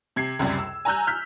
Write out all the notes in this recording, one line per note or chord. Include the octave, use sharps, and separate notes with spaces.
C3 G#6 C7
C#2 F#2 C3 G3
E6
G#5 A#5 E6 F#6 G6
F6 G6 B6